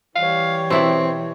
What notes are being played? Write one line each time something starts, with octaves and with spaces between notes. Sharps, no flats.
E3 G3 C#5 F5
B2 C4 E4 D5